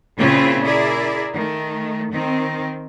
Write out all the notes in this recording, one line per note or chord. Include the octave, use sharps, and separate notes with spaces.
A#2 C#3 C4 C#4 E4 F4
E4 G#4 A#4 D5
D#3 A3
D#3 C4